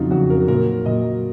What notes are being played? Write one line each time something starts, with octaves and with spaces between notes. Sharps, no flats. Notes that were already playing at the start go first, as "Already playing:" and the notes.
Already playing: F2 C#3 F#3 D#4 F4
F2 C#3 F#3 F#4
A#4
A#2 F#3 A#4
A#2 F#3 D#5